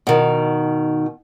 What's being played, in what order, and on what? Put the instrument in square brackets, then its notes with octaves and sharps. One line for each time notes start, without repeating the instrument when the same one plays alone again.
[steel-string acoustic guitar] B2 D#3